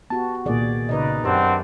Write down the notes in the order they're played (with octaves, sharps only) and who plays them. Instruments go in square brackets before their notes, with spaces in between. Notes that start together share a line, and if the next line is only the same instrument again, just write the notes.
[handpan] B3 F#4 G4 [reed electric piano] A5
[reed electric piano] C2 A#2 [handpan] D#3 G#4 D5
[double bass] C#3 D#4 [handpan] B4 D5 D#5
[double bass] F#2 [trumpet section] C4 D4 F#5 [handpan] G4 B4